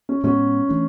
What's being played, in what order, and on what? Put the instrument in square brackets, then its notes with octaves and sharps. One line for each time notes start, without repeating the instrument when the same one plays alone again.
[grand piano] C#4
[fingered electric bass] A2 G#3 B3 [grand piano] C#4
[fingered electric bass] E3 A3 D4